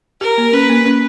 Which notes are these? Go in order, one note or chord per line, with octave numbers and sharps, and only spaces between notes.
G4 A#4
A#3
C#4 B4
A#3
C#4